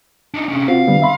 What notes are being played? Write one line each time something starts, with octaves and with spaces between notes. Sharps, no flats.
D4 D#4
C3 C#4
C4 F4 F#4 F5
D3 G3 B3
E5 B5 C6